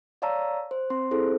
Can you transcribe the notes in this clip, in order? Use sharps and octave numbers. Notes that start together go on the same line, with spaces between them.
C#5 D5 F5 A5 A#5 E6
C5
C4 C6
C4 E4 G#4 A4 C5